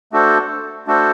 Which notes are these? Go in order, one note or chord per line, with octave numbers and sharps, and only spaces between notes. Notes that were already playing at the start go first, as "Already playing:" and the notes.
A3 D4 F#4 A4 C5
A3 D4 F#4 A4 C5